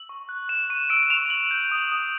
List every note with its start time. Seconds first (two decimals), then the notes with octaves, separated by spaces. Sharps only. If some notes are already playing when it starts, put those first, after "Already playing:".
Already playing: E6 F#7
0.09 C#6
0.29 F#6
0.49 C#6 E7
0.70 C#6 D#7
0.90 E6 D7
1.03 E7
1.10 C#6 F7
1.30 E6 F#7
1.51 G6
1.71 D#6
1.92 D#6